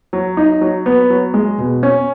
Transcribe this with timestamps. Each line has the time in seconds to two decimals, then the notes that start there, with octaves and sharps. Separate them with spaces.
0.13 F#3
0.37 D#4
0.61 F#3
0.86 B3
1.10 F#3
1.34 G#3
1.58 B2
1.83 C#4